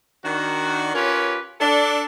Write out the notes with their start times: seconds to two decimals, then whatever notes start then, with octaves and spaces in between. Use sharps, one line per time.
0.25 D#3 D4 F#4
0.95 C#4 F4 G4 A#4 B4 C#5
1.61 D4 A4